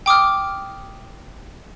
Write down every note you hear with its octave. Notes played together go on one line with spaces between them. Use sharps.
G5 D6 D#6 F6